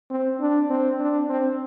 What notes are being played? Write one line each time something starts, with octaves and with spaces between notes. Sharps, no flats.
C4
D4
C4
D4
C4